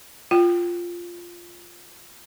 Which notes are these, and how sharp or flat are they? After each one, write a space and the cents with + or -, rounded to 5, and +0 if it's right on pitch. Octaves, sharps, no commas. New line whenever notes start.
F4 +0 G5 -10